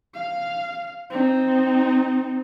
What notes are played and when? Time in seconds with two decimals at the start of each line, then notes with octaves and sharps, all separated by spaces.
0.15 F5
1.11 C4 D#4